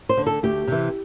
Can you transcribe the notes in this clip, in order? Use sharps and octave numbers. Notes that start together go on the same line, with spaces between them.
C5
D3
A4
D2 G4
C3 E3